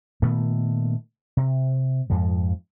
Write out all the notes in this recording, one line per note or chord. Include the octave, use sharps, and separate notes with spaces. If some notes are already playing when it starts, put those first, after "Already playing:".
A#2 D#3 A3 B3
C3
F2 G#2 F3